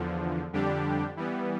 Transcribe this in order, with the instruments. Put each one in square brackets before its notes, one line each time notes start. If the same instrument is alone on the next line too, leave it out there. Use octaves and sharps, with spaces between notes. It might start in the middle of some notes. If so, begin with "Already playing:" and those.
Already playing: [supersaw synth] E2 D3 F3
F2 D3 G3 D4 G4
E3 G3 B3